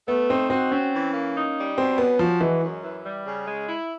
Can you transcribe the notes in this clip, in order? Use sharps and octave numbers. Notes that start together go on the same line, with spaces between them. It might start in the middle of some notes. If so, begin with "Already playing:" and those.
A3 B3
C4 D#4
C4 F#4
C4 C#4
E3
A#3
D#4
G3
B2 C4
B3 C#4
F3 F#4
E3 G#3
F#2
E3
G3
C#3
G#3
E4